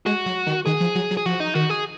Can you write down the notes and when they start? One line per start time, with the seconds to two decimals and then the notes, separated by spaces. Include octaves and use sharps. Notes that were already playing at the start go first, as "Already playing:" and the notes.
0.06 G#3 F#4
0.26 F#3
0.47 D#3
0.66 D#3 G#4
0.80 F3
0.95 F#3
1.11 F#3
1.17 G#4
1.26 F3 F#4
1.40 D#4
1.55 D#3 F#4
1.70 G#4